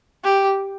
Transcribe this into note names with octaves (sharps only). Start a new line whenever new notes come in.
G4